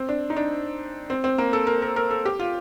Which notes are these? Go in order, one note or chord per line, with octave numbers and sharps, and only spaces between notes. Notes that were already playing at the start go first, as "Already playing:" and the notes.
Already playing: C4
D4
D#4
D4
C4
C4
A#3
A4
A#4
A#4
A#4
A4
G4
F4